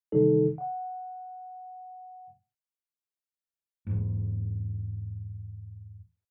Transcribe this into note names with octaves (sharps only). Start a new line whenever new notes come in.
C3 D#3 E3 G3 D#4 A4
F#5
E2 G#2